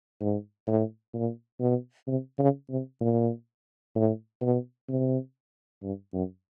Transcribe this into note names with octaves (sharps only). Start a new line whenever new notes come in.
G#2
A2
A#2
B2
C3
C#3
C3
A#2
A2
B2
C3
G2
F#2